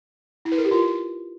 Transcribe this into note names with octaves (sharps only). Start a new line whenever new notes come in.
E4
B4
A#4
G4
F4